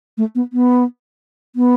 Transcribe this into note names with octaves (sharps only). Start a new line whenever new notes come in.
A3
B3
B3
B3